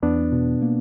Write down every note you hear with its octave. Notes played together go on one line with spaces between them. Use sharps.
E2 B3 D4
B2
A#3